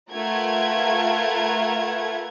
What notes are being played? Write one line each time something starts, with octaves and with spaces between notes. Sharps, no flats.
A3 F4 A#4 B4 F#5 G#6